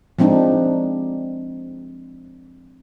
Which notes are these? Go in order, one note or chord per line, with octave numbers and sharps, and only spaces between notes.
F3 G#3 C4 D4 D#4